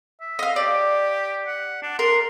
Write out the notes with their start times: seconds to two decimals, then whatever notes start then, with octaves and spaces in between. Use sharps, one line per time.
0.21 E5
0.39 D#5 F5
0.56 G4 D5
1.47 F#5
1.83 D4
1.99 A#4 C6